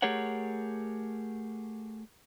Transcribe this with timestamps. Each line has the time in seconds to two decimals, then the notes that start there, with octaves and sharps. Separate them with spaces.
0.02 A3 G4 G#4 A#4 C#5 F#5